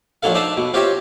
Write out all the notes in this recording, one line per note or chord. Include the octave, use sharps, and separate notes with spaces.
A#1 F#3 D#4 A4 F5
D4 D#4 C5 E5 A5
B2
C4 F4 G4 C#5 D#5 E5